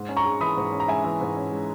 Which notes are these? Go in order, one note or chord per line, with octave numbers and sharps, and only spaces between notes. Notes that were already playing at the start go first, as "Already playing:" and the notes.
Already playing: G#2
C#4
A#5 C#6
G#3
E3 B5 D#6
G#2
C#4
A#5
G#3 E5 G#5
E3
G#2
C#4
G#3